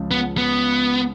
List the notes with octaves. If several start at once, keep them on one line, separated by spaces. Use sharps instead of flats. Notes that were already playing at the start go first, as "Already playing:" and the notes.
Already playing: C#2 C#3 F3
B3
B3